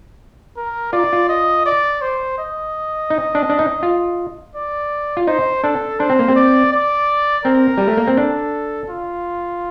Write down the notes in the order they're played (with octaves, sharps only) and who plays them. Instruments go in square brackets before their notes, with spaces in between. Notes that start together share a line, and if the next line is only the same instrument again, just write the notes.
[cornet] A#4
[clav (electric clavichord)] F4 [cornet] D5
[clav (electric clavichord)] F4
[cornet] D#5
D5
C5
D#5
[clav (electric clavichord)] D#4
D4
D4
D#4
F4
[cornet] D5
[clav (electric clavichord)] F4
[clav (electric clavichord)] D#4 [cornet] C5
[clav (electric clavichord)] D4 [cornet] A4
[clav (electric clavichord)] D4 [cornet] C5
[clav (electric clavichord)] C4
A#3
C4
[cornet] D5
D5
[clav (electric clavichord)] C4 [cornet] A#4
[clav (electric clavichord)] G3
A3
A#3
C4
[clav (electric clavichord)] D4 [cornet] A4
[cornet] F4